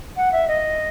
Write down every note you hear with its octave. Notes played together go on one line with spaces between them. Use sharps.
F#5
E5
D#5